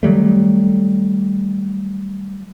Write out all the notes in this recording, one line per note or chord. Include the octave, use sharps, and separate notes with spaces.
D#3 F#3 G3 A3